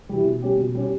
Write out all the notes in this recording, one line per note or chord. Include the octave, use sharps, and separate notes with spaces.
E3 G3
B2
G3 C#4 G4
B2
G3 C#4 G4